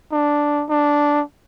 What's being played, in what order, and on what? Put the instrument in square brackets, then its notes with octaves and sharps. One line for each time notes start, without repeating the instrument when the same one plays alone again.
[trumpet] D4
D4